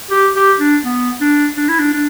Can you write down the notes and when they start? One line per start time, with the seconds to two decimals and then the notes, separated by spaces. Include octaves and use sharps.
0.11 G4
0.36 G4
0.60 D4
0.85 B3
1.21 D4
1.57 D4
1.69 E4
1.79 D4
1.94 D4